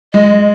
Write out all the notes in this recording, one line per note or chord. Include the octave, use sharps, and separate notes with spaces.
G#3 D#5